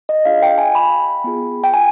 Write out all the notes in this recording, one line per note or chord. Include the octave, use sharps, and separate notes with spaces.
D#5
D4 F4 G#4 F5
G5
G#5
B5
B3 F4 G#4
G5
G#5